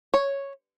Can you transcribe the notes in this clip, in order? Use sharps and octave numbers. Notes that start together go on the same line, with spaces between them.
C#5